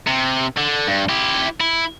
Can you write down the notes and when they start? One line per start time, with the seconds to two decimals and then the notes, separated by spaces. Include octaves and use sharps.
0.07 C3
0.57 D3
0.87 G2
1.09 E4 G4
1.60 E4